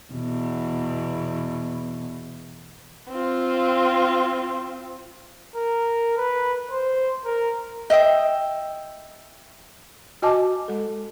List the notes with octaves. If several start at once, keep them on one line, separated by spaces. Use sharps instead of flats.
E2 B2
C4 F4
A#4
B4
C5
A#4
D#5 E5 G5 D#6
F#4 D#5 G#5 A5 D6
G#3 A4